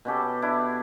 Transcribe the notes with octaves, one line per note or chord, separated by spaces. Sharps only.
B2 C#4 G4 A4
D4 E4